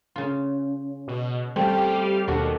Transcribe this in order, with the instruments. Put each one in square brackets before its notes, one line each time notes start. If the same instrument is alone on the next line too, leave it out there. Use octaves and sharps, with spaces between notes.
[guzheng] C#3 F4
[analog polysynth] B2
[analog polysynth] G3 G4 F5 [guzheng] A3 C4
[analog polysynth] D#2 B2 [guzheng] D4 F#4 A4